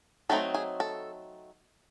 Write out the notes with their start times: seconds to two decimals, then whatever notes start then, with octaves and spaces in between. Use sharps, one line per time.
0.29 F#3 A3 C4 D#4 A4
0.54 G#4
0.80 A4